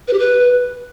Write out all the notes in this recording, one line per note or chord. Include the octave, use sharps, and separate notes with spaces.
B4
G4
B4